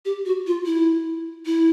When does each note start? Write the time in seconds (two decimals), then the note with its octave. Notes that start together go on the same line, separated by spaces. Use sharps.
0.05 G4
0.26 F#4
0.47 F4
0.66 E4
1.46 E4